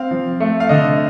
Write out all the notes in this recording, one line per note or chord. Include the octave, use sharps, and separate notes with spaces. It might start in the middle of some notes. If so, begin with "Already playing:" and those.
Already playing: C4 F5
F3
A3
F5
D3 D#5